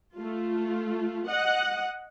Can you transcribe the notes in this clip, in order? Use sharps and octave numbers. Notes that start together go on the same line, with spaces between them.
A3 F4
D#5 F#5